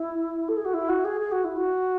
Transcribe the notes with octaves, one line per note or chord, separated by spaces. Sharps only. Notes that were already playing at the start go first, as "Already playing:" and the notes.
Already playing: E4
A4
G#4
F#4
E4
F#4
G#4
G#4
F#4
E4
F#4